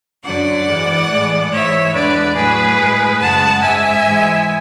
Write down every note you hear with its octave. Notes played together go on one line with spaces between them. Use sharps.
F#2 D3 F#3 D5 F#5
G#2 E3 G#3
A2 E3 G#3
G#2 E3 G#3 C#5 E5
E2 D3 G#3 B4 D5
A2 F#3 G#4 B4
A2 G#3
F#2 C#3 G#3 F#5 A5
G#2 G#3 E5 G#5
G#2 E3 G#3